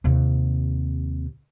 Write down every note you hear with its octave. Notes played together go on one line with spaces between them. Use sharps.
D#2 C3